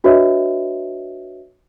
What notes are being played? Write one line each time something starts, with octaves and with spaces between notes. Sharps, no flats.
D4 F#4 B4 C#5 D#5 E5